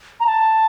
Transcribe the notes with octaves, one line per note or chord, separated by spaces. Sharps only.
A#5
A5